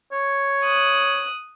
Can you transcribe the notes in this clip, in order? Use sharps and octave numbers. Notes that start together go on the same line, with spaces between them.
C#5
D#6 F#6